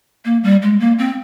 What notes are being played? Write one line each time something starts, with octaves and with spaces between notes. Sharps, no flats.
A#3
G3
G#3
A#3
C4